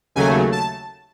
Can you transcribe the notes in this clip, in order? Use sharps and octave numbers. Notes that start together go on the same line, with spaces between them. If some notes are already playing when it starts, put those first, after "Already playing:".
D#2 C#3 F#3 A3 G#5
A5